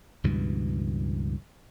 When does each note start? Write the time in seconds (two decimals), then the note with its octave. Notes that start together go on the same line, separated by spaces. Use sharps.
0.24 C#2 G2 B2 E3